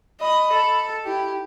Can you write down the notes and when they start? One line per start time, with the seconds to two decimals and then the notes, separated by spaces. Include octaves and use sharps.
0.21 D#5 B5
0.53 A4
1.05 E4 G4